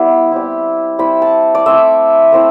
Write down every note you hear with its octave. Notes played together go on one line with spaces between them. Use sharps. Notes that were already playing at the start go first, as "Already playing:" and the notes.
Already playing: G3 B3 E4
G3 C4 E4
G3 C4 E4 B5
A5
D5
A3 C4 E4 E5
A3 C4 E4